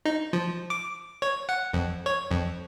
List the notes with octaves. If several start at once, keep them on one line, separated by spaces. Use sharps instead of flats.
D#4
F3
D6
C#5
F#5
F2
C#5
F2